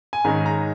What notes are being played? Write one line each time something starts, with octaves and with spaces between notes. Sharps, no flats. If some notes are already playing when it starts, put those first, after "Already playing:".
G#5
G#2 D#3 G#3 C#4 A#5
A#5